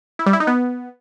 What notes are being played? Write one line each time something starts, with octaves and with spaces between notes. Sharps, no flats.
E4
G3
E4
D#4
B3